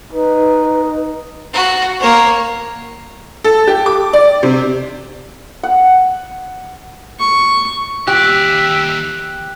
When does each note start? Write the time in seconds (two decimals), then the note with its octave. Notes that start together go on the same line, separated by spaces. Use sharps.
0.13 D#4 B4
1.53 F#4
2.00 A#3 C#5
3.44 A4
3.67 G4
3.86 D6
4.13 D5
4.43 C3
5.63 F#5
7.20 C#6
8.07 D#2 G4 D5 E5 F#6